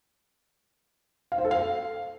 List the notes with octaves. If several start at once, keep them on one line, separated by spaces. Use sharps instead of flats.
F5
C5
A4
F5